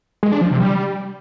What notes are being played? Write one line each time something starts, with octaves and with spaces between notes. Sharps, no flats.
G#3
D4
F3
C3
G3